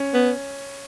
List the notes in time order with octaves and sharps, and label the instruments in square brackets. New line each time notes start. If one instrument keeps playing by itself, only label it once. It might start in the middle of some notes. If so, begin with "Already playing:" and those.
Already playing: [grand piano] C#4
[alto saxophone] B3